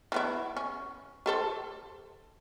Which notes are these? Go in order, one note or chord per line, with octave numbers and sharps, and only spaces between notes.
E3 B3 E4
C#4
G4 A4 C5